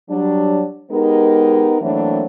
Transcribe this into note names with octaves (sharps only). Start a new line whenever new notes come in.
F#3 G3 D4
G#3 B3 D#4 G4 A#4
E3 F#3 A3 A#3 C4 D4